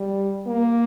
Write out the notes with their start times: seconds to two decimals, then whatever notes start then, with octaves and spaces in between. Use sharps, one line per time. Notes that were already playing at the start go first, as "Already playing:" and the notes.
Already playing: G3
0.47 A#3